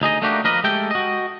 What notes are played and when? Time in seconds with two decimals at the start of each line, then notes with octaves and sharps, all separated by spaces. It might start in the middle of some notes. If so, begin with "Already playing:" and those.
0.02 D2 D#4 G#4 D#5
0.22 A3 A#3 D4 D#4 F#4 G4
0.44 F3 A#3 A#4 B4 D#5
0.64 G#3 A3 G4 A4 G5
0.91 F#4 D#5